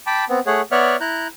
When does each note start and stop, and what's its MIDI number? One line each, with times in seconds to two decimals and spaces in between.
0.07 0.25 79
0.07 0.25 81
0.07 0.25 83
0.07 0.25 86
0.29 0.40 59
0.29 0.40 60
0.46 0.62 57
0.46 0.62 68
0.46 0.62 73
0.46 0.62 78
0.71 0.96 59
0.71 0.96 73
0.71 0.96 74
0.71 0.96 76
0.71 0.96 78
0.71 0.96 89
1.00 1.27 64
1.00 1.27 82
1.00 1.27 90
1.00 1.27 91